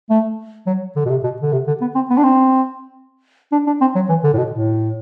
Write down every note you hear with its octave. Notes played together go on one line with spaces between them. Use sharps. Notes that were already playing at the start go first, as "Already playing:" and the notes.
A3
F#3
D3
B2
C3
B2
D3
C3
D3
B3
C4
B3
D4
C4
D4
D4
C4
F#3
E3
D3
A2
B2
A2